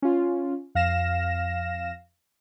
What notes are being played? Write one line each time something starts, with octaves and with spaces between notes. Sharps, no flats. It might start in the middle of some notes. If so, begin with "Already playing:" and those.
C#4 F4
F2 F5 F6 A#6 E7